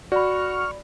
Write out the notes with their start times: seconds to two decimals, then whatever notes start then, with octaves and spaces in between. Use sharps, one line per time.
0.12 F#4 D5 B5 C#6 F6